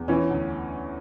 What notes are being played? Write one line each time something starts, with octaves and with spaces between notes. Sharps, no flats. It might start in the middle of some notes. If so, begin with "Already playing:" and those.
Already playing: E2
E3 C#4
D2